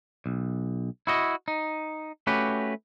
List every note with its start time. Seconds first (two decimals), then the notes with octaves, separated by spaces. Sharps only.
0.26 B1
1.07 E4 F#4 D#5
1.48 D#4
2.27 A3 C#4 F#4 G4 B4